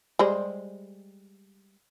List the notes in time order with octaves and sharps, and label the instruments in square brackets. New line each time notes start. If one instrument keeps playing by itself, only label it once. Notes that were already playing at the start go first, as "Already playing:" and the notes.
[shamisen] G3 G#3 C5